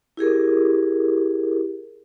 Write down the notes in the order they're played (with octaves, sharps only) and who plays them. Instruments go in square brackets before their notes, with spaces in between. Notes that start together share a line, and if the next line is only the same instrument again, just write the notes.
[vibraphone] E4 G4 G#4 A#4